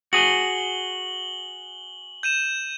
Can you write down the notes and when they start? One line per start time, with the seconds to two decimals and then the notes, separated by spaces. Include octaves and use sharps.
0.13 F#4 G#4 F#7 G7
2.23 G6 D#7 E7